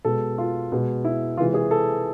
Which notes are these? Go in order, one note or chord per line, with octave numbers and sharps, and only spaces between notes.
B2 G#3 A4
F4
B2 G#3
E4
C3 E3 G#3 F4
G#4
A4